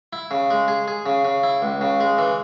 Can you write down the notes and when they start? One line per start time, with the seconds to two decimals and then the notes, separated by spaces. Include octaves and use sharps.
0.13 E4
0.31 C#3
0.50 G#3
0.68 G#4
0.88 G#4
1.06 C#3
1.25 C#3
1.43 E4
1.62 C#2
1.81 C#3
2.00 G#3
2.18 E3